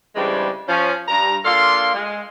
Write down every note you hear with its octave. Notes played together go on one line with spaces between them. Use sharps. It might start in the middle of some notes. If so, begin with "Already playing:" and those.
C#3 E3 G3 G#3 C4 D4
F3 C#4
G2 A#5
A#3 D4 F4 A4 F5 C6
G#3